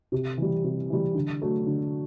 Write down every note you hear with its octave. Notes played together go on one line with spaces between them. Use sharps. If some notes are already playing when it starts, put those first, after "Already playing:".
C3
E3 G3
C3
E3 G3
D3
F#3 A3
D3